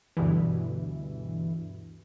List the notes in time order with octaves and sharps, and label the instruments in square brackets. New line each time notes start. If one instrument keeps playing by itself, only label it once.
[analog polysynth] D2 G2 B2 D3 E3